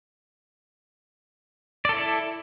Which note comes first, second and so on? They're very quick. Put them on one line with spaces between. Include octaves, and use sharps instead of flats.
D5 A4 E4